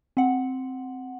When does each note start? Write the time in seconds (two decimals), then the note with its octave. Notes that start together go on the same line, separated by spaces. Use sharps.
0.17 C4 F#5